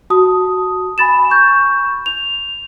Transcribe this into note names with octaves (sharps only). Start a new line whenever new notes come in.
F#4 A5 D#6
G#5 B5 A6 E7
C#6 G6
F7